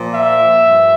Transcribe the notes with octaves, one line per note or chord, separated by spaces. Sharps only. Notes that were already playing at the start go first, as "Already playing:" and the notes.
Already playing: A#2 F3
E5
G2 F3